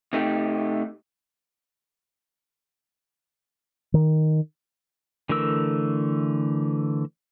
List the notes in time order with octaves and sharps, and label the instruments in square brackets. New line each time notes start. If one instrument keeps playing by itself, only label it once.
[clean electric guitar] C3 A3 D#4 G4
[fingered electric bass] D#3
[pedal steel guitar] D3 E3 A3 A#4 E6